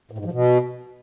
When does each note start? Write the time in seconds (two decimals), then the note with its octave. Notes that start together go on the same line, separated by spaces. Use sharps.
0.11 A2
0.18 G#2
0.25 F3
0.32 B2